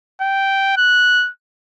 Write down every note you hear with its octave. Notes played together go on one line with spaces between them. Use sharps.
G5
F#6